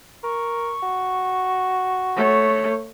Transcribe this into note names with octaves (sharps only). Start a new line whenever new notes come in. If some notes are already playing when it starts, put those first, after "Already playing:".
A#4 C#6
F#4
A3 C#5